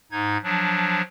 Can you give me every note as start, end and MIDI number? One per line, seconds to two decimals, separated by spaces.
0.11 0.37 44
0.11 0.37 63
0.11 0.37 92
0.44 1.02 53
0.44 1.02 54
0.44 1.02 62